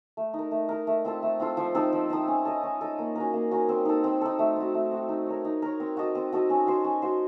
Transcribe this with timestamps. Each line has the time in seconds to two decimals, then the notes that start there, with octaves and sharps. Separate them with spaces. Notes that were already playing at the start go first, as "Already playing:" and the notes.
0.17 A3
0.34 D#4
0.39 A#4
0.51 A3
0.69 D#4 A#4
0.87 A3
1.05 C4 F4 A4
1.23 A3
1.40 C4 F4 A4
1.57 F3
1.75 C4 D#4 A4
1.93 F3
2.10 C4 D#4 A4
2.28 C#4
2.45 A4 D#5
2.63 C#4
2.81 A4 D#5
2.99 A#3
3.16 C#4 F#4 A#4
3.33 A#3
3.51 C#4 F#4 A#4
3.69 C4
3.85 D#4 A4
4.04 C4
4.21 D#4 A4
4.39 A3
4.56 C4 F#4
4.74 A3
4.91 C4 F#4
5.09 D#4
5.26 A#4 C#5
5.45 D#4
5.62 A#4 C#5
5.80 C4
5.97 F#4 A4 D#5
6.15 C4
6.33 F#4 A4 D#5
6.50 C#4
6.67 F#4 C5
6.84 C#4
7.02 F#4 C5